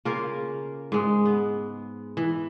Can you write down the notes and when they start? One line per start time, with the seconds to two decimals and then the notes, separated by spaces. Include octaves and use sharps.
0.05 C#3 A#3 F4 A#4
0.92 G#2 G#3
1.25 B3
2.17 E3